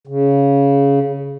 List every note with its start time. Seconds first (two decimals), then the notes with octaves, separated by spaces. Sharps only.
0.07 C#3